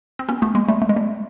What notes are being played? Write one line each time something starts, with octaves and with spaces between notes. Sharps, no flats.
C4
B3 C#4
A3 B3
G#3 A#3
G3 A3
A3
G#3
G3 A3